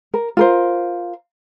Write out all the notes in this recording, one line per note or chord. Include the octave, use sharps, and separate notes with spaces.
A#4
F4 A#4 C5